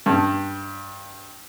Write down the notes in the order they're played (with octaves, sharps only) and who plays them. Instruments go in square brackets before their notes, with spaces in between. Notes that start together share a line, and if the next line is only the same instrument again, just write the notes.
[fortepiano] G2